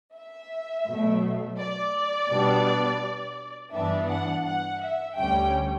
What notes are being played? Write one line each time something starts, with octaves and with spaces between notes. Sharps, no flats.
E5
B2 F#3 A3
D5
B2 G3 B3 D4
G2 E3 B3 D4 E5
F#5
F#5
E5
D2 D3 G3 C#4 G5